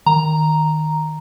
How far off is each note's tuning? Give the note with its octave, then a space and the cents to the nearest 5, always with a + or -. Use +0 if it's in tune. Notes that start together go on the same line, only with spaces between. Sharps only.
D#3 +0 A#5 +0